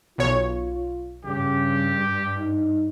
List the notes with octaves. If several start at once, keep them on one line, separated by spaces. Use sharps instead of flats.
B1 F4 C#5
G2 C#3 G4
D#4